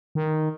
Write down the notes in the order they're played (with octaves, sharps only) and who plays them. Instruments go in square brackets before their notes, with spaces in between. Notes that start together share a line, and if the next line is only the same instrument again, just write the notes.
[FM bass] D#3